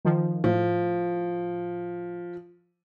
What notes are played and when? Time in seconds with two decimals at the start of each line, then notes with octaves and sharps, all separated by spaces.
0.05 D#3 F3
0.44 A2 F3